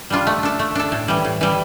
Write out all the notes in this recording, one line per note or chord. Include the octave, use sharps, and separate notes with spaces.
G3 D4 F4
A3
D4 A4
A3
D4 A4
A2
E3 G3
A2
E3 G3